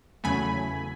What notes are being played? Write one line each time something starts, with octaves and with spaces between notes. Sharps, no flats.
E2 C#3 F#3 A3 G#5 B5